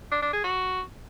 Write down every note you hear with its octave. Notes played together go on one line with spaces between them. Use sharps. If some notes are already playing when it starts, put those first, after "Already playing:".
D4
D4
G#4
F#4